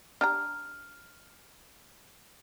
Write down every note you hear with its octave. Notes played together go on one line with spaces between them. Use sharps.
D4 G4 A#5 F6